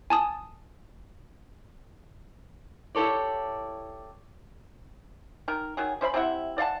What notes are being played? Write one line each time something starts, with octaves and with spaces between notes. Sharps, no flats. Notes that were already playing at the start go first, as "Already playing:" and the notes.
G#5 A5 D#6
E4 G4 A4 C#5 D5
D#3 A#4
D#3 F#3 G#4
C#4 C5 E5 B5
C3 C4 E4 F#5
D5 F5 F#5 A5